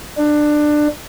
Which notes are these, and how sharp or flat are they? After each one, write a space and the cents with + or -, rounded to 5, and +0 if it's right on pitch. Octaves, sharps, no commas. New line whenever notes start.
D4 +20